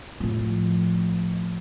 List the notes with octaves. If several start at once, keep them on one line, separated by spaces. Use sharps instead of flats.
A2 F3